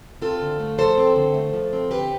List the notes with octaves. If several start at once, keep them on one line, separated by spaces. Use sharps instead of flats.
C4 F4 A4
D3
A3
F3 A4 C5
C4
D3
A3
F3
C4
D3 G4 B4